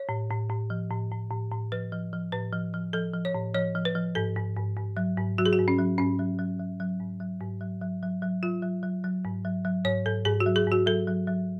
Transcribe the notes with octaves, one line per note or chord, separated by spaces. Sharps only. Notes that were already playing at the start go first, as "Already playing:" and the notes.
Already playing: C#5
A2
A2
A2
F3
A2
A2
A2
A2
F3 B4
F3
F3
A2 B4
F3
F3
F3 A4
F3
C#5
A2
F3 C#5
F3
B4
F3
G#2 A4
G#2
G#2
G#2
F#3
G#2
F#3 F#4
G#4
F#4
G#2
C#4
F#3
G#2 C#4
F#3
F#3
F#3
F#3
G#2
F#3
G#2
F#3
F#3
F#3
F#3
F#3 F4
F#3
F#3
F#3
G#2
F#3
F#3
G#2 C#5
G#2 A4
G#2 G#4
F#4
F#3
G#4
G#2 F#4
F#3 A4
F#3
F#3